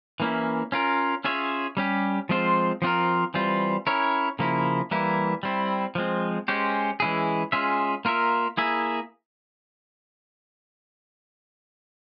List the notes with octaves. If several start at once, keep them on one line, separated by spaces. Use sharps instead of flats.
E3 A#3 C#4 E4
C#4 F4 A#4
C#4 F4 G#4 C#5 E5
G3 C#4 G4
F3 G#3 C4 F4 C5
F3 C4 F4 A#4
E3 G3 C4 F4
C#4 E4 A#4 C#5
C#3 F3 A#3 E4
E3 G3 A#3 E4
G3 C4 E4
F3 G#3 C4
G#3 C#4 G4 C5
E3 G#3 C#4 E4 G#4
G#3 C#4 F4 G#4 E5
A#3 F4 A#4 E5
A#3 E4 G#4 E5